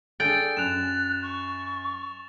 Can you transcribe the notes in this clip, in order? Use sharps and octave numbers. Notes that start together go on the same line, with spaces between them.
D4 G#4 A4 G5 A6
F#2 F#6 E7 F7
C#6